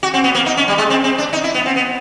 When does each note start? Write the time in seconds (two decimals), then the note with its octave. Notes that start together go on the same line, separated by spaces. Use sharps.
0.03 F#4
0.14 C4
0.24 B3
0.35 A#3
0.46 D#4
0.57 C#4
0.68 G3
0.78 G#3
0.90 C4
1.04 C4
1.18 D4
1.33 D#4
1.44 E4
1.54 B3
1.66 C4
1.76 B3